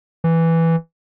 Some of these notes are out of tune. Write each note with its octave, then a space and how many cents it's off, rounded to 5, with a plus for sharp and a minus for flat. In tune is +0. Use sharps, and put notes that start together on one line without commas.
E3 +0